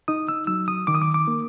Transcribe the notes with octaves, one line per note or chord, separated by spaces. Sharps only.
D#4 D#6
E6
F#3 E6
D#6
D#3 D6
D#6
D6
D6
A#3